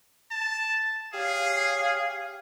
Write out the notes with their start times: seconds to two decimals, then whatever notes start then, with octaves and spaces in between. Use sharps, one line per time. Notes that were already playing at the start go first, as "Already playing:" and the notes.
0.31 A5
1.14 G4 G#4 C#5 F5